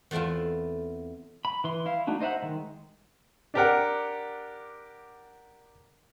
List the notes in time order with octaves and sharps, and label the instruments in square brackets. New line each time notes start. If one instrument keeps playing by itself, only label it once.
[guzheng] E2 A3 C4 E4 F4
[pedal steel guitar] B5
E3 C6
E4 F5
A3 D4 D#4 F#4
D#4 C5 E5 F#5
D#3 G#3
[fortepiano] D4 G4 A#4 F#5